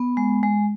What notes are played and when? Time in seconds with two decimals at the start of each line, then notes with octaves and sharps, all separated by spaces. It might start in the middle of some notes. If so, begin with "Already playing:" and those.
Already playing: B3
0.17 G#3
0.43 G#3